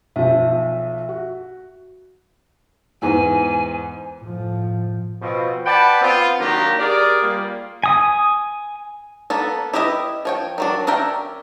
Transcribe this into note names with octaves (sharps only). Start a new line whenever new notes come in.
B1 F3 E5
F#4
E2 G#2 G#5
A2 F3
B2 F3 C4
B4 D5 F#5 G5 A5 B5
B3 C4 F4
D#3 F#3 A#3 D4 G4 A#5
G4 G#4 A#4 D5
G3 A#3 F4
G#5 D#6
A#3 B3 A4
E4 G4 B4 D#5 E5
F3 C#5 G5
D#3 F#3 D4
C#4 D4 A#4 E5 G5